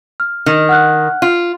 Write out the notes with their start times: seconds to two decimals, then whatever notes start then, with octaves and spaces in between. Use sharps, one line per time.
0.20 F6
0.46 D#3
0.69 F#5 F6 F#6
1.22 F4